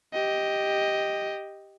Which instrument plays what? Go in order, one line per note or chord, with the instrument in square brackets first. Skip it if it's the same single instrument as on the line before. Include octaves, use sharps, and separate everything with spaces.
[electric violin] G4 D#5